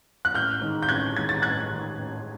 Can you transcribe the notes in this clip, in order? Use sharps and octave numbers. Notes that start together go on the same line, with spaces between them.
F#6
A1 F6 G6
G#2 D#3
G6
A1 F#6 G#6
G#2 D#3 G#6
A6
A1 F#6 G#6
D#3
G#2
A1